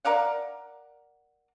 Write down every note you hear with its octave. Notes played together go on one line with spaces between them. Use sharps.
A#4 D5 F5 F#5